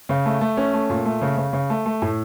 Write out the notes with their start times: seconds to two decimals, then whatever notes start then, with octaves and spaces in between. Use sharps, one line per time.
0.09 C#3
0.25 A3
0.41 A3
0.57 C#4
0.73 A3
0.90 A#2
1.05 A3
1.21 C#3
1.38 C#3
1.53 C#3
1.70 A3
1.86 A3
2.02 A2